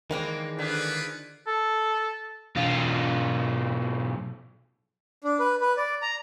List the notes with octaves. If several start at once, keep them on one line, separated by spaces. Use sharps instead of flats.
D#3 E3 G#3 A#3 C4 D4
D3 F4 G#4 B4
A4
B1 F4
D4
B4
B4
D5
A#5